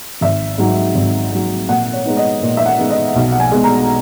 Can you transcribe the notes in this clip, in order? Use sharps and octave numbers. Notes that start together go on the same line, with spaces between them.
G#1 E5
G#2 F#3
G#1
G#2 F#3
A#2 F#5
C#5
G#3 B3 D#4
D#5
A#2
E5
F#5
G#3 B3 D#4
D#5
B1
F#5
G#5
B2 G#3
A#5